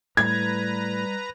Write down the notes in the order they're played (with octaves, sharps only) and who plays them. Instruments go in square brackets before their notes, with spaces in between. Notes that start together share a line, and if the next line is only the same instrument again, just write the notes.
[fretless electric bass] A2 [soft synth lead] G3 [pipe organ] B4 A#5 [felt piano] G#6